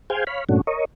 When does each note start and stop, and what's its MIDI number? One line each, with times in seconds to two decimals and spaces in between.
0.10 0.24 68
0.10 0.24 72
0.10 0.24 77
0.10 0.24 79
0.10 0.24 80
0.27 0.44 73
0.27 0.44 77
0.27 0.44 83
0.49 0.61 43
0.49 0.61 46
0.49 0.61 57
0.49 0.61 61
0.49 0.61 62
0.49 0.61 66
0.67 0.85 70
0.67 0.85 73
0.67 0.85 75